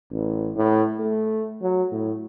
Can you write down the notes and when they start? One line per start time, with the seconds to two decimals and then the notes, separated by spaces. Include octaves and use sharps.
0.11 A1
0.56 A2
0.99 A3
1.62 F#3
1.91 A2